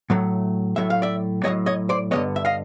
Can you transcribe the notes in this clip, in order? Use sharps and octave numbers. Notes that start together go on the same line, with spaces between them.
A2 F#3 A3
A2 F#3 A3 E5
F5
D5 E5
A2 F#3 A3 C#5 D#5
C#5 D#5
C5 D5
G2 D3 F3 G#3 B3 C#5 D#5
E5
D#5 F5